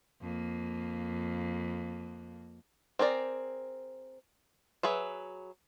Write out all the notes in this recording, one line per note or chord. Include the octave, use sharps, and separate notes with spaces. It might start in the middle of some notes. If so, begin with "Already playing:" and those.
F2 A#3
C4 G#4 A#4 D5
F#3 G#4 B4 E5